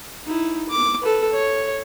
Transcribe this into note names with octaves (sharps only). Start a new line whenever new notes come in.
D#4 E4
D6
A4 B4
C#5